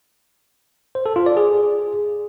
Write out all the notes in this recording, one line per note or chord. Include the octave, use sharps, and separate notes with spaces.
C5
A4
F4
D5
G#4